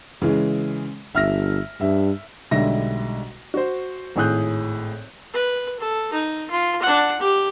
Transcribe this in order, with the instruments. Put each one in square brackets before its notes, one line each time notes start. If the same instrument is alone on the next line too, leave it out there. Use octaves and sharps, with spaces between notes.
[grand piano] C#3 E3 G#3
[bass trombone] G1 [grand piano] E5 F6 A#6
[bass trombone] G2 [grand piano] E5
[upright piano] B1 D3 G3 G#3 E5 A#6
F#4 C5
G#1 A2 G#4 D#6 F#6 G6
[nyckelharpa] B4
A4
D#4
F4
D4 F#5
G4